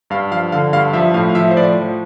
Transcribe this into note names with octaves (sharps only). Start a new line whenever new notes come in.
G2 F5
F3 F5
D3 F5
G2 F5
F3 E5
A2 F5
F5
F3 E5
C5
A2 D5
F3